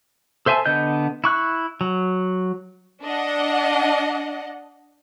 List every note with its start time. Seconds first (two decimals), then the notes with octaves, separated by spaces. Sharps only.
0.46 A4 C5 E5 G#5 A5
0.66 D3 B3 D#5 G6
1.24 E4 C#6 F#6
1.81 F#3
3.05 D4 D#5 F#5